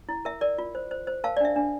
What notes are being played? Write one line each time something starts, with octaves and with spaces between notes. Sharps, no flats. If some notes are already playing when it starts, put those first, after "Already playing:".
E4
A#4 E5
A#4 D5
F4
C5
C5
C5
A#4 F5 A5
D5
D4 E5
D4